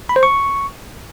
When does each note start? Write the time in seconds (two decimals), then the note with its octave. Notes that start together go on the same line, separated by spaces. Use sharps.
0.09 B5
0.16 C5
0.23 C#6